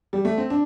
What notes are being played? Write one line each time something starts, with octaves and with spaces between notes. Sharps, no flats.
G3
A3
C4
D4